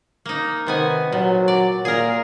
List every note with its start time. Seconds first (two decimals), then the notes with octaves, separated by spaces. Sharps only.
0.26 A#3 D#4
0.67 C3 D#3 B3 G#5
1.12 A#2 F#3
1.48 D5
1.85 A#2 G#4 A#4